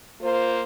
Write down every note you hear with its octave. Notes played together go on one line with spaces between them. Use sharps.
A#3 F4 C5